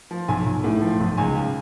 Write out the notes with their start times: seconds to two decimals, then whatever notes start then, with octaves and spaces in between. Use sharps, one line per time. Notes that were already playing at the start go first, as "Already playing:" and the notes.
0.11 F3
0.28 B1 G#5
0.46 B1
0.64 A2
0.82 F3
1.00 B1
1.17 C#2 G#5
1.35 C#3